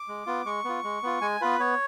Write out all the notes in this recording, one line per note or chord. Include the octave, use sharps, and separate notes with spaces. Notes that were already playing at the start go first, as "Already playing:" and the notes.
Already playing: D6
G#3
B3 F4
G#3 C#6
B3 F4
G#3
B3 F4
G#3 G#5
B3 F4 B4
B3 C#5